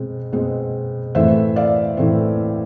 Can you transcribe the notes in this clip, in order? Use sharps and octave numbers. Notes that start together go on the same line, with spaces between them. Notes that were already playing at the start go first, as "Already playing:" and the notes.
Already playing: B2 G#3 C4
B2 G#3 C4
A2 E3 A3 C4 C5 E5
D5 F5
A2 E3 A3 C4